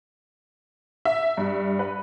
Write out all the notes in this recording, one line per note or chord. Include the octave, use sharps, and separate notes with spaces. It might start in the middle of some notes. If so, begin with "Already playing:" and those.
E5
G2
B4